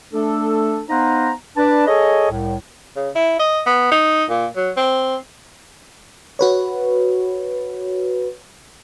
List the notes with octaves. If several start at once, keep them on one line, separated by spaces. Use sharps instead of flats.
A3 D4 A4
B3 D#4 C5 F5 F#5 A#5
D4 B4 D5 A5
G#4 A4 C#5 D#5
C2 A2
C#3
E4
D#5
B3
D#4
A#2
F#3
C4
F#4 B4 C#5